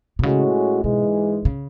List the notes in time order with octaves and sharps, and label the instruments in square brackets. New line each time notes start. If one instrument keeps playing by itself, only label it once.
[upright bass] B2
[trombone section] A2 G#3 C#4 F#4 [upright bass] C#3
[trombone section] G#2 E3 G#3 [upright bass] B2
[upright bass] C#3